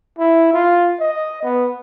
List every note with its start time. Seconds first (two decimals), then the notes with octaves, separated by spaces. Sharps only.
0.19 E4
0.53 F4
1.00 D#5
1.43 B3